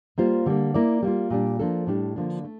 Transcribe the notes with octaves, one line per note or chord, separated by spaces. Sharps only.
G3 A#3 F4 C5
D3 G3 A#3
A#3 E4 A#4 D5
G3 A#3 F4
A#2 G3 D4
F3 A#3 D4 A4
A2 G3 D4
D3 F3 A#3 D4
A3